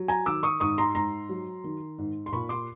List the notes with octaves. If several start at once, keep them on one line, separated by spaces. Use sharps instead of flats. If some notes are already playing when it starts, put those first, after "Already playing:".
Already playing: F#3
G#5 A#5
D#3 D6 E6
C#6 D#6
G#2 C#6 D#6
A#5 C6
G#2 A#5 C6
F#3
D#3
G#2
C6
A#2 B5 C#6
C6 D6